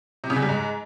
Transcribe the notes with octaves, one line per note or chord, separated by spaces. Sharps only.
C3
C#3
E2
G3
G#2